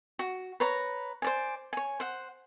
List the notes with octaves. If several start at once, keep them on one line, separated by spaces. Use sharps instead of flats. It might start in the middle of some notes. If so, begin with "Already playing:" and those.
F#4
B4 C#5 A#5
C5 D5 G#5
C#5 G#5
C5 F#5